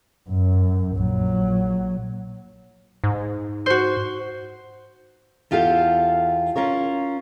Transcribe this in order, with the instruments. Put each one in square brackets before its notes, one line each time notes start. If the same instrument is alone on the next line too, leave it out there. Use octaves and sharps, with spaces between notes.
[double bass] F#2
A#1 F#3
[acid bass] G#2
[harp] F#4 C5
[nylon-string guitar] E2 F4 G4 A4 F5
C#4 F4 A#4 C#5